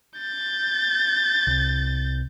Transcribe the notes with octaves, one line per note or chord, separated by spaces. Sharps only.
G6 A6
C2